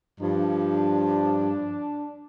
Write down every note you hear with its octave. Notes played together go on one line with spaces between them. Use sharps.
G2 F3 D4